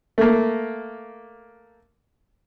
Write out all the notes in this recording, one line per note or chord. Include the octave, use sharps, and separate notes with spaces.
A3 A#3